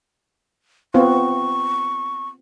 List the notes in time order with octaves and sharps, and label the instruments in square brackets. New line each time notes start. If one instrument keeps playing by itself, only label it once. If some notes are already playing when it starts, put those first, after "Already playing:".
[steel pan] B3 C4 F4 [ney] C#6